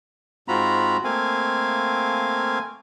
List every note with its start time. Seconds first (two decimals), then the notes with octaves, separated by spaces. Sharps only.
0.48 G#2 C4 F4 F#4 A#5 B5
1.04 A3 A#3 C4 F5 G#5